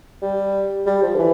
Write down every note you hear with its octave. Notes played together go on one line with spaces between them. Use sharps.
G3
G3
F3
D3
E3